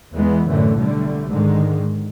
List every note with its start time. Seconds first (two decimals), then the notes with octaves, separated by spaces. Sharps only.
0.16 E2 E3 G#3 B3
0.47 F#2 A2 D3 E3 A3
0.78 B1 D3 G3 A3
1.29 G#2 D3 D#3 G#3